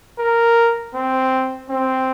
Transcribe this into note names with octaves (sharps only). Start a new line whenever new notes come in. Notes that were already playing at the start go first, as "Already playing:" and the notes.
A#4
C4
C4